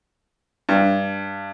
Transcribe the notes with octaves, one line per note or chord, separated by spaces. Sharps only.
G2